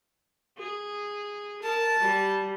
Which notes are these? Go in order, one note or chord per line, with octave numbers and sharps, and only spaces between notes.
G#4
A#4 A5
G3